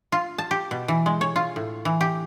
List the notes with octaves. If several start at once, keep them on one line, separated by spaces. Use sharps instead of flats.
F4
A5
G4
B2
E3
G#3
C#5
F4
A2
E3
G4